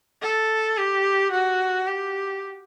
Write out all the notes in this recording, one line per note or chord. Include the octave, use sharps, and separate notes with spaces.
A4
G4
F#4
G4